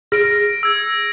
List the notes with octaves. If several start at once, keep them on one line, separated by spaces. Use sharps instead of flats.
G#4 A#6 D7
E6 G#6